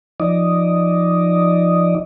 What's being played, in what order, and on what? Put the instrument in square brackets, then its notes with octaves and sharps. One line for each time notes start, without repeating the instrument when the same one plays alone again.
[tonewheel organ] F3 D#4 D5 D#5